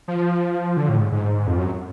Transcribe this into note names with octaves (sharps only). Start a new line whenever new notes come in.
F3
D3
A2
G#2
G#2
F2
F#2